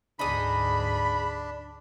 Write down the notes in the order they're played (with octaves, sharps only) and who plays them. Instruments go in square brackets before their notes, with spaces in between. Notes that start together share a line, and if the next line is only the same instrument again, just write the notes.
[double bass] D2 G#2 [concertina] D4 [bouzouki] D#4 G#4 [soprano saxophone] B5